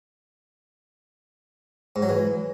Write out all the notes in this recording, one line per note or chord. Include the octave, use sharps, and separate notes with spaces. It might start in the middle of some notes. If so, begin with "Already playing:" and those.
G#2
F#3
E3